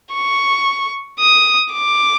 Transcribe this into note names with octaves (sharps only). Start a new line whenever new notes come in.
C#6
D#6
D6